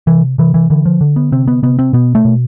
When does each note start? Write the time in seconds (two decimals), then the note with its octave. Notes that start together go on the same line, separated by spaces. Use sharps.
0.07 C3 E3
0.38 C3 E3
0.54 E3
0.70 D3 E3
0.85 F3
1.01 D3
1.16 B3
1.32 C3 C4
1.48 B3
1.63 C3 B3
1.79 C4
1.93 B2 B3
2.15 A3
2.25 B2